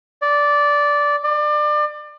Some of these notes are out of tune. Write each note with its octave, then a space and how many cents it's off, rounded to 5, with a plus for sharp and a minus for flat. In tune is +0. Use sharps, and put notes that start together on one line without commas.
D5 -10
D5 +30